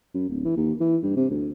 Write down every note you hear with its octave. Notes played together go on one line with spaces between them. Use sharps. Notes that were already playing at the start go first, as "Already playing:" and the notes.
F#2
D1
E3
D#2
E3
G2
C3
D2